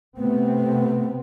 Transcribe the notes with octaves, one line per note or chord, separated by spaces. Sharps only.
C3 A3 B3 C4